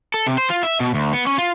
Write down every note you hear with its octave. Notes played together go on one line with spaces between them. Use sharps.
A4
C3
C5
F4
E5
B2
D2
B3
C#4
F4